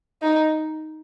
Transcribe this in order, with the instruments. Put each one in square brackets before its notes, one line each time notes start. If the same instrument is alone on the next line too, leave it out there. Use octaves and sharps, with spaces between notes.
[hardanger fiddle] D#4 [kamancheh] D#5